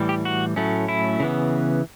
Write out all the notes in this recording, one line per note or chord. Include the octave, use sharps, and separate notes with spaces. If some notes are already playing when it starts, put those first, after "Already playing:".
Already playing: A2 E3 G3
G4
F#4
A2 F#3 A3 C#4
E4
C#3 E3 B3